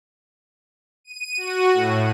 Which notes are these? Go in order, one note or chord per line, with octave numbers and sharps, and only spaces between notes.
D#7
F#4
A2